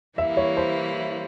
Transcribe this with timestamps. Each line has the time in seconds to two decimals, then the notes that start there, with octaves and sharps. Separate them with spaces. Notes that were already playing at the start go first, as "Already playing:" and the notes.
0.18 E3 G3 A#3 E4 E5
0.37 C#5
0.57 C5